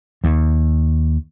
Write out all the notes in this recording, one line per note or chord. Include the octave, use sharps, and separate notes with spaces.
D#2